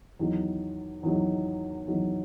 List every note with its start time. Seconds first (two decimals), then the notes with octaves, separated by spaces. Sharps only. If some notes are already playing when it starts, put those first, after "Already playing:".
0.19 E2 D#3 F#3
1.03 E2 D#3 F#3
1.88 E2 D#3 F#3